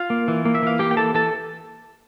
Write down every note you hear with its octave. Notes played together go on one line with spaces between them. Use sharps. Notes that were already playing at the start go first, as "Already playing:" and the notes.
Already playing: F4 F5
A#3
E3
A#3
E5
E3 F5
A#3 G4 G5
G5
E3 A4 A5
E3 A4 A5